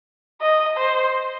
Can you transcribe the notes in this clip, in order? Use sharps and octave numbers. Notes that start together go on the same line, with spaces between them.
D#5
C5